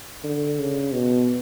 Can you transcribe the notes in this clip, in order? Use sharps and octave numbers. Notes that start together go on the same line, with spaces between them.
D3
C#3
B2